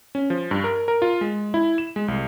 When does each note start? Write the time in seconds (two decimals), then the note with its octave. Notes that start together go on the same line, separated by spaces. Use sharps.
0.15 C#4
0.30 F3
0.51 G2
0.64 A#4
0.88 A#4
1.02 F4
1.21 G#3
1.54 E4
1.78 E7
1.96 G#3
2.08 C2